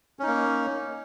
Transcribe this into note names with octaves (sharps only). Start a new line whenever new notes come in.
A#3 C#4 D#4